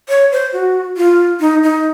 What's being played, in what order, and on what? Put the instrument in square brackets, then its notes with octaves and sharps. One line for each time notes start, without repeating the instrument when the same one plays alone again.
[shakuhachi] C#5
C5
F#4
F4
D#4
D#4